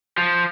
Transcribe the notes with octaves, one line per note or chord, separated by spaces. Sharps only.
F3